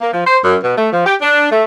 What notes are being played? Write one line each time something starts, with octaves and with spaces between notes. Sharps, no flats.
A#3
F3
C5
F#2
B2
A3
F3
G4
D4
A3